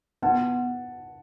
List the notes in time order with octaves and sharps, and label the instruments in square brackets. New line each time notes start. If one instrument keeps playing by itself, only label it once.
[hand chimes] B3 [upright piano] F#5 A5